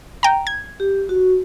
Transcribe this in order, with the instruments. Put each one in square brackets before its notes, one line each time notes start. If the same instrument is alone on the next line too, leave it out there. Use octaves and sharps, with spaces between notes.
[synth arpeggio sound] G5 A#5
G#6
[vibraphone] G4
F#4